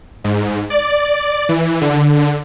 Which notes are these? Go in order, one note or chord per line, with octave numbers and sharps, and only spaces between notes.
G#2
D5
E3
D3